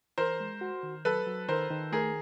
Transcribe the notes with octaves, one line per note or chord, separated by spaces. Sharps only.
E3 A#4 C5
G#3
F#4
D#3
F#3 A4 B4
F#3
D#3 A#4 C5
D#3
A3 G#4 A#4